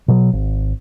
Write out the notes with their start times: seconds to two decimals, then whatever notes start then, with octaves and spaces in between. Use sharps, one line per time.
0.08 B2 F#3
0.33 G#1